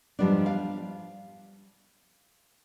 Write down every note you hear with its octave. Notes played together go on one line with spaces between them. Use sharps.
G#2 F3 G3 B3 D4
F5